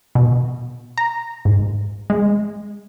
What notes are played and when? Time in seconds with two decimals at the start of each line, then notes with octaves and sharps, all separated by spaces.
0.15 B2
0.98 A#5
1.45 G#2
2.10 G#3